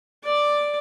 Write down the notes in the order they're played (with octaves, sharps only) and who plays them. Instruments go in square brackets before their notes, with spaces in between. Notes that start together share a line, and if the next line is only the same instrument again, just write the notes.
[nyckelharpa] D5 D6